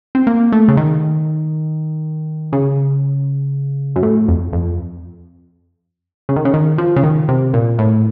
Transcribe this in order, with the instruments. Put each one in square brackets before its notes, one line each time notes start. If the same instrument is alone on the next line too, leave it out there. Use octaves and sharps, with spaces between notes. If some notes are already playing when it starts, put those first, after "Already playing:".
[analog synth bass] C4
A#3
A3
C#3
D#3
C#3
F#2
A2
F2
F2
C#3
D#3
C#3
D#3
F3
C#3
D#3
C3
A#2
A2